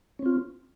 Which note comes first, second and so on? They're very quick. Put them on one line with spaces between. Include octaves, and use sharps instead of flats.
C#4 C4 F4